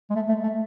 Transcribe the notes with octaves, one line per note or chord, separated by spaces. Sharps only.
G#3
A3
A3
A3